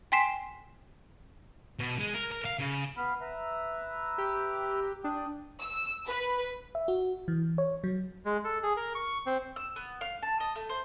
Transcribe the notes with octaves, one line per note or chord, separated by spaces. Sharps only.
G5 G#5 C6 B6 C7 E7
B2
G#3
A#4
A#4
F5
C#3
B3 F5 B5
B4 E5 A#5
G4
D4 G5 D#6
E6
B4
E5
F#4
E3
C#5
F#3
G#3
A4
G#4
A#4
C#6
C4
E6
B3
F5
A5
D#5
A3
C5